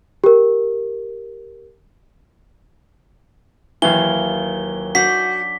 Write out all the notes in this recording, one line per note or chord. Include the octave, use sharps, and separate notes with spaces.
G4 A#4
D#2 E3 F#3 F5 G7
D4 F#4 G6 B6